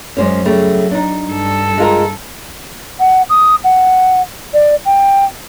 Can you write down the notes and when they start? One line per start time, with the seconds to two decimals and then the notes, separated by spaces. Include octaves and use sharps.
0.17 F#2 G#3 C#4 C5 D5
0.45 C#3 F#3 G3 A3
0.91 D4 D#4
1.28 G2 A4
1.78 G#3 F4 A#4
2.99 F#5
3.29 D#6
3.64 F#5
4.53 D5
4.85 G5